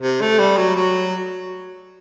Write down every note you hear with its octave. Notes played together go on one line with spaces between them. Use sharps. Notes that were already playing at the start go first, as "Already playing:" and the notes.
C3
A3
G3
F#3
F#3